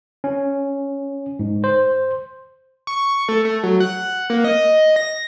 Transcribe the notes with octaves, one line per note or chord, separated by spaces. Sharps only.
C#4
G#2
C5
C#6
A3
A3
F#3
F#5
A#3
D#5
A#6